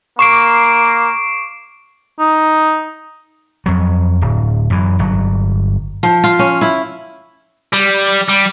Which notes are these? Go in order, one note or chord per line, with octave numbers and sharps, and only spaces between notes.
A#3 C#6 D6 C7 D7
D#4
F2 F#3
D1
F#2 E3
G1 F#3
F3
F4
C#4
E4
G3
G3